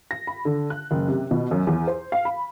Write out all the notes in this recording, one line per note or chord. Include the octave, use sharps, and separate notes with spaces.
A#6
B5
D3
F#6
F#1
C3
B2
F#2
E2
C5
F5
B5